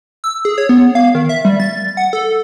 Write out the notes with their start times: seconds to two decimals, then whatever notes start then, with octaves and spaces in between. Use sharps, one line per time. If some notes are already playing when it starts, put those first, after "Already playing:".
0.24 E6
0.45 G#4
0.58 C#5
0.69 B3
0.95 F5
1.15 D#3
1.29 E5
1.45 G3
1.60 A6
1.97 F#5
2.13 A4